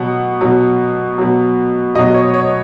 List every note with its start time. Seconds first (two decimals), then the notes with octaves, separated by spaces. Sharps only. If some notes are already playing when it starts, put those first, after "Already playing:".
Already playing: B2 F#3 F#5
0.41 B2 F#3
1.18 B2 F#3
1.95 B2 F#3 D#5
2.14 C#5
2.34 C#5